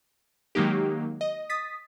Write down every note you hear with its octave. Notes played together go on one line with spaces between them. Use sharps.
D#3 F#3 G#3 A#3 D#4 G4
D#5
D#6 A6 B6